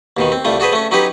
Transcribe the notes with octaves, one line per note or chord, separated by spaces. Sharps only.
D#2 B2 D#3
C4
C2 G3 A3 F4
D4 F#4 G#4 B4 C5
A3 C#4
F#3 C#4 D#4 G4 B4